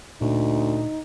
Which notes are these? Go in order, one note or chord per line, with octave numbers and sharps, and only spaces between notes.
D2 A#2 D#4